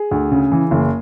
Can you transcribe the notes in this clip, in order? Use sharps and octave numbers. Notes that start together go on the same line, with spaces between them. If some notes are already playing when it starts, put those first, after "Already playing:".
Already playing: G#4
D2
C#3
E3
F#1